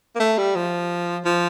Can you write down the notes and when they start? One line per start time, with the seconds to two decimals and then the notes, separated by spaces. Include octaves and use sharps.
0.15 A#3
0.20 A3
0.38 G3
0.56 F3
1.25 F3